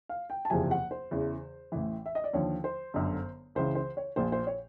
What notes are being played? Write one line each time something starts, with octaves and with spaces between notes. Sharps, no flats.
F5
G5
A5
F#1 E2 C3 F3 G#5
F#5
C5
E2 C#3 E3
A1 A2 E3
E5
D#5
D5
D#2 D3 F3 C#5
C5
G1 F#2 D3
C#2 C#3 E3 C5
C5
C#5
A#1 A#2 F3 C5
C5
C#5